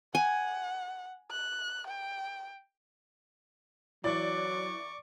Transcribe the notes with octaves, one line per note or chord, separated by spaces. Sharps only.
F#5 G#5
F#6
G5
E3 F#3 D5 C#6 D6